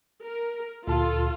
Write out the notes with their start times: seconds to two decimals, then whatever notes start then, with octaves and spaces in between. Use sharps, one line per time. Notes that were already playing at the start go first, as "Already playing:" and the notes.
0.24 A#4
0.88 D2 A#2 F4 A4 A5